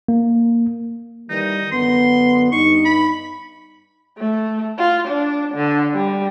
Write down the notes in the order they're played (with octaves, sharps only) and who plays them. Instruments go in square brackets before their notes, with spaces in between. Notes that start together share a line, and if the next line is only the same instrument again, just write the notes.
[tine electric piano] A#3
[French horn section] D#3 E3 G3 [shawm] D#4
[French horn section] F#2 D3 B3 [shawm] C6
[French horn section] G2 D#4 [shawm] C#6
[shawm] B5
[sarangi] A3
F4
D4
D3
G3